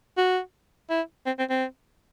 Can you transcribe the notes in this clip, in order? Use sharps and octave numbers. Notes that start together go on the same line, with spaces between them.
F#4
E4
C4
C4
C4